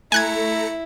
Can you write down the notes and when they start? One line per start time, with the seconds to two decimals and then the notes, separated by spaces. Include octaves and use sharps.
0.12 A3 E4 G#5 A#5 F#6 G#6 C#7